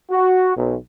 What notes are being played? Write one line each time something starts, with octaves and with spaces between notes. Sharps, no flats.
F#4
B1